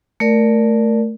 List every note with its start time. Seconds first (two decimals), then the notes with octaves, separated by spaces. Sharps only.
0.20 A3 A#4 D5